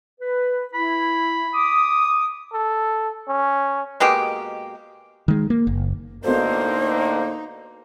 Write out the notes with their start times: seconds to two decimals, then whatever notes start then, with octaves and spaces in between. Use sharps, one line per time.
0.21 B4
0.74 E4 B5
1.54 D6 D#6
2.53 A4
3.28 C#4
4.00 B2 G#3 A#3 G4
5.28 D#3 G#3
5.50 A#3
5.67 F#1
6.24 A2 D3 A#3 B3 D#4 F#4 A4 C5